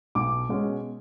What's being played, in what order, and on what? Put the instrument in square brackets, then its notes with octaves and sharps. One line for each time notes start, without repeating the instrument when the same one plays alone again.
[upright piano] B1 D6
B2 G#3 C#4